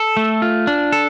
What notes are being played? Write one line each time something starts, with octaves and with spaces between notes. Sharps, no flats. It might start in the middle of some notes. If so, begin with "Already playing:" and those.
Already playing: A4
A3
F4
D4
A4